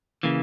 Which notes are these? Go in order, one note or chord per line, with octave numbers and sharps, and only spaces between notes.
C#3 E3 A#3